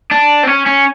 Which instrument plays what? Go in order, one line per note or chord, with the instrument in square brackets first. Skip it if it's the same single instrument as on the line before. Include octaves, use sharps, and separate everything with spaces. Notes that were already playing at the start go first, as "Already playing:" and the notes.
[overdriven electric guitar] D4
C4
C#4
C#4